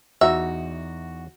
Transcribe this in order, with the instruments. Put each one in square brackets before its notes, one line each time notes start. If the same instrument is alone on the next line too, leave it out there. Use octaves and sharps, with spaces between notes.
[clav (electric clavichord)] E2 D#4 A#5 [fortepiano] F#4 [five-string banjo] E5